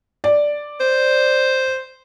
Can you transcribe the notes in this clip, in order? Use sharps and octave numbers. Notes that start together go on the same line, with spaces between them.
D5
C5